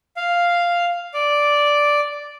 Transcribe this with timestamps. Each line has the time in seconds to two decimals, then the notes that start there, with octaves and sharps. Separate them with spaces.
0.16 F5
1.14 D5